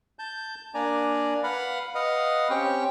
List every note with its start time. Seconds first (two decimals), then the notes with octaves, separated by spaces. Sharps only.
0.19 A5 G6
0.74 A#3 D4 D5 G#5 A#5
1.43 B4 F5 F#5 B5
1.95 B4 D#5 F5 F#5
2.50 C4 C#4 G4 G5 C#6